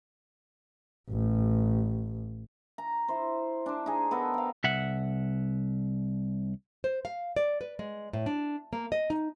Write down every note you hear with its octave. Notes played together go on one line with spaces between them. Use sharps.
A1
A#5
E4 C5
D4 C5
D#4 G#4
B3 A4 A#4
F5 G5
C2 E5 F#5
C5
F5
D5
B4
G#3
A2
D4
A#3
D#5
D#4